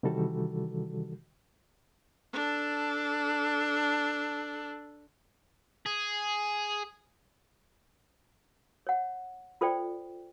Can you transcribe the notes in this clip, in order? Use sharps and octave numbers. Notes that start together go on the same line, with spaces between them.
C3 D#3 E3 G3 F#4 A4
D4 A4
G#4
C#5 F#5
F4 A4 C5 D5 G5